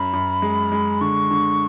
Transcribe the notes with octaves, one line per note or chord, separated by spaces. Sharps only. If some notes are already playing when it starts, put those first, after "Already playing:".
Already playing: F#2 B5
F#2
G#3
G#3
D3 C#6
D3